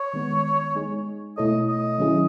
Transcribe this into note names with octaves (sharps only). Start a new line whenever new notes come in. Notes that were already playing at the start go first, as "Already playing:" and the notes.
Already playing: C#5
D#3 G#3 B3
G#3 D#4 G#4
B2 A3 E4 A4 C#5 D#5
D#5
D#3 F#3 C#4 E4 G#4